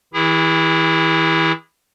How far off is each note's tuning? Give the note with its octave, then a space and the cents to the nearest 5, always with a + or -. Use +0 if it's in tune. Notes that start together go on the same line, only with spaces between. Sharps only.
E3 -40 E4 +0 G#4 -35